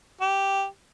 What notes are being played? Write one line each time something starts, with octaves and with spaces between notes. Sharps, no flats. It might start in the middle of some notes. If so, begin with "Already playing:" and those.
G4